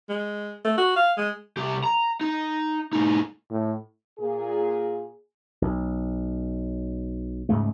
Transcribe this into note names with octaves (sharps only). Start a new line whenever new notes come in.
G#3
A3
F#4
F5
G#3
C2 G4
A#5
D#4
A2 D#4
A2
A#2 G#4
B1
C#2 G#2 G#3 A3